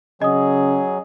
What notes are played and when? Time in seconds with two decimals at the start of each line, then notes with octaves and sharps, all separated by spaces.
0.22 C#3 F#3 G#4 D#5 D#6